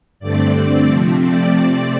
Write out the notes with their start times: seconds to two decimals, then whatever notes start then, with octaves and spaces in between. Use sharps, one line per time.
0.19 G2 D3 A3 C4 D5
0.54 D5
0.89 C3 F3 A3 C4
1.24 D5
1.58 C3 A3 C4